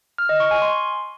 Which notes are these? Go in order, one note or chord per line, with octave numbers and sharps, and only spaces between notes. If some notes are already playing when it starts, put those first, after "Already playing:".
F6
D#5
C#6
G#5
C6